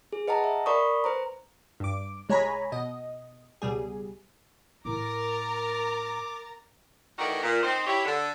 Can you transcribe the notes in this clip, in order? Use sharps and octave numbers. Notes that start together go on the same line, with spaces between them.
G#4
B4 D#5 F#5 A5 A#5
E5
A#4 D5 B5 C#6 D#6
B4 C5 A#5
G2 D6
C2 G#3 C#5 G#5 A#5 B5
B2 D#5
C#2 B2 G3 G#4
A2 E4 A#4 A#5 D6 A6
D#3 E3 A3 F#4 A#4 D5
A#2
C4 D#4 C5
E4 G4 C#5
D3